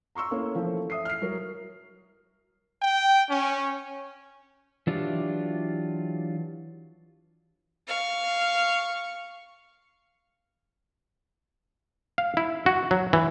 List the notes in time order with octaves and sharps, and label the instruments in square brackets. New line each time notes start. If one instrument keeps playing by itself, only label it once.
[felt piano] A#5 C6 C#6 E6
A3 A#3 C#4 E4
E3 F3 A3
E5 D#6 C7
F6 C7
F#3 A#4
[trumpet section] G5
C#4
[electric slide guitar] E3 F#3 D4 F4 G4
[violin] F5 C#6
[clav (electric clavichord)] F5
E4
F#4
F#3
E3